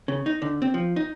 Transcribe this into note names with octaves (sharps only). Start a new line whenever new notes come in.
C#3
D#4
D3
C4
F3
D#4